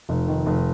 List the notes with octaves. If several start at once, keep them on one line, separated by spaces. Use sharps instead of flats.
F1
D#3
F1